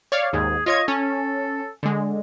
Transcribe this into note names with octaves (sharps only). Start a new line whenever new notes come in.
C#5 D5 F5
D#2 G#2 G#4
F4 C#5 D#5 G#6
C#4 A4
D3 G#3